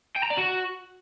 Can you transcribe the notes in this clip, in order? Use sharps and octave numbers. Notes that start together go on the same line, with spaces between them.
G5
A#5
D5
F#4